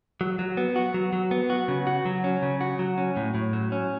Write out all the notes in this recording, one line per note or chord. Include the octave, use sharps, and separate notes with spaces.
F#3
F#3
B3
F#4
F#3
F#3
B3
F#4
C#3
F#4
F#3
C#4
C#3
F#4
F#3
C#4
A2
A2
F#3
C#4